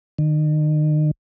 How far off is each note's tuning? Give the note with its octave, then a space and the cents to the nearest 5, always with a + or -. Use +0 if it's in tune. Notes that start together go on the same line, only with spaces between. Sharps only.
D#3 -35